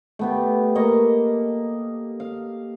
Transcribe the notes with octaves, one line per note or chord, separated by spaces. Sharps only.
A3 B3 G4
A#3 D#5 C#6
F5